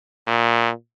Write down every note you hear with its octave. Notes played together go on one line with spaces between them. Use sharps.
A#2